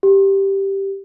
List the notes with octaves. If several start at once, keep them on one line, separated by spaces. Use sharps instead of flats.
G4